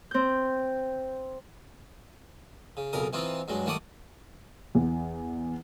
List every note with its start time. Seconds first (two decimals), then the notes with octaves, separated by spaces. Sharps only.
0.11 C4 G6
2.77 C#3
2.93 B1 F2 C#3 A#4 D#6
3.13 E3 C4 D#4 F4
3.48 G2 F#3 G#3
3.66 D#3 G3 A3 F#5 D6 D#6
4.75 E2